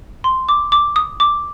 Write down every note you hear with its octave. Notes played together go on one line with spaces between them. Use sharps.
C6
D6
D6
D#6
D6